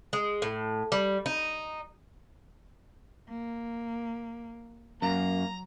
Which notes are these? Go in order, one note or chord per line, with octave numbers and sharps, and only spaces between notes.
G#3
A2
G3
D#4
A#3
F#2 F#3 A#3 A#5